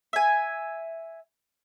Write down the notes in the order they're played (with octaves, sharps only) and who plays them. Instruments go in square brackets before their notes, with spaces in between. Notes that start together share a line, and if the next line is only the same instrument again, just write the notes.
[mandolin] E5 G#5